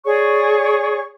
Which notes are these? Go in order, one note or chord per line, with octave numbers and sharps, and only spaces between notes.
G#4 C#5 D5 C#6